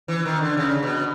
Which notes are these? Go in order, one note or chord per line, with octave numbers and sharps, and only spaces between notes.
E3
D#3
D3
C#3
B2